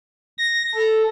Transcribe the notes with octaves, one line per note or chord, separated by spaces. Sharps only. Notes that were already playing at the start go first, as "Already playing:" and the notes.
A#6
A4